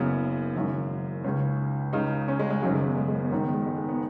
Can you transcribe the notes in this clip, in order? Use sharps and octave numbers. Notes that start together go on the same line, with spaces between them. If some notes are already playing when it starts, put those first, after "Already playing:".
Already playing: F#1 F#2 C#3 B3
G#1 F#2 C#3
C#2 C#3 C#4
C#2 C#3 D#4
C#4
G#3
G#3
G#1 F#2 C#3 F#3
G#3
B3
G#3
G#3
B3
G#1 G#2 D#3 C#4
B3
G#3
G#3
G#3
B3